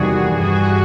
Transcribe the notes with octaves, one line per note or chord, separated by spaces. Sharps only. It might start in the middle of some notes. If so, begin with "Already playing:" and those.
Already playing: E2 C3 D#3 G3 F#4 G#4
G2 E3 G3 F#4 G#4